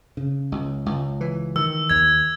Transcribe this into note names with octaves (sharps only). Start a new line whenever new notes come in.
C#3
C#2
C#2
E3
D#3 E6
D#2 G#6